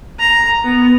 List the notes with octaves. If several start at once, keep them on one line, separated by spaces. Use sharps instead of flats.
A#5
B3